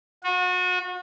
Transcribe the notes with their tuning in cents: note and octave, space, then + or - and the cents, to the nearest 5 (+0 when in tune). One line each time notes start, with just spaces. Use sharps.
F#4 -35